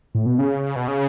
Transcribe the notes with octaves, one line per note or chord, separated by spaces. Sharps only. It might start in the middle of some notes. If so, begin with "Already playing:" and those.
A2
B2
C#3
B2
C#3